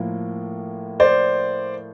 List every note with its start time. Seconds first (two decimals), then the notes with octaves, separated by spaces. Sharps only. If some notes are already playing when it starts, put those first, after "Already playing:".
Already playing: A2 F3 A#3
1.00 C5 D5